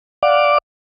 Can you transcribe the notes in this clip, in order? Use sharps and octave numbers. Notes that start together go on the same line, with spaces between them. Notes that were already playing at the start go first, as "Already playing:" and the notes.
D5 F5 F#5 D6